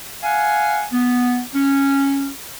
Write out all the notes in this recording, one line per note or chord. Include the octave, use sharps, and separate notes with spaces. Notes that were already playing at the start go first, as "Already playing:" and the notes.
F5 F#5 G#5
B3
C#4